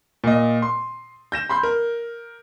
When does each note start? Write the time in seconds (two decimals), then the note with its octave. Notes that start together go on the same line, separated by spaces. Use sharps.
0.24 A#2 D#5
0.62 C6
1.32 G6 A#6 E7
1.49 B5 C6 G6
1.63 A#4